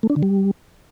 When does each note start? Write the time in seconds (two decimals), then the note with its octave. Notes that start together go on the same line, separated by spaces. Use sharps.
0.03 A3
0.10 D4
0.16 D3
0.23 G3